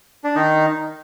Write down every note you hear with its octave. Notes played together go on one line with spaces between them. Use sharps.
D4
D#3 D#4